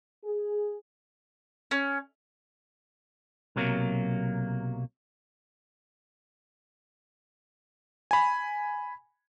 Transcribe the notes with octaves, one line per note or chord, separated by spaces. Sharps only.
G#4
C#4
B1 C3 F#3 A#3
G#5 B5